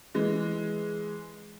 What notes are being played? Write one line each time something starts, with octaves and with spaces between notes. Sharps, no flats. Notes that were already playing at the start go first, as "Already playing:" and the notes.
E3 G#3